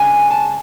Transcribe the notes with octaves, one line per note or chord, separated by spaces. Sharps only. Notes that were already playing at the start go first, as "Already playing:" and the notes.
Already playing: C#3 G#3 D4 G#5
A5